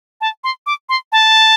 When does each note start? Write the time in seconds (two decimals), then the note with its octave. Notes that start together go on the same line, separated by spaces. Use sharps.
0.21 A5
0.44 C6
0.66 D6
0.89 C6
1.12 A5